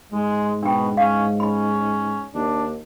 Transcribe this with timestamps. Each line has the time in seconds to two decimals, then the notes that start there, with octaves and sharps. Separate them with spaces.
0.12 G#2 G#3
0.63 B2 D4 G5
0.97 C#4 F5
1.40 C#4 B5
2.34 D#2 D4